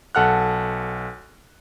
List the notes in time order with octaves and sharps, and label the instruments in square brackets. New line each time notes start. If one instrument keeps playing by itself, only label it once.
[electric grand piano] B1 A4 F#5 F6 F#6